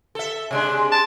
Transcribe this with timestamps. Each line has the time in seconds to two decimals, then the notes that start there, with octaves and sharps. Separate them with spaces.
0.15 A4 E5
0.51 C3 G#3 D4
0.92 A5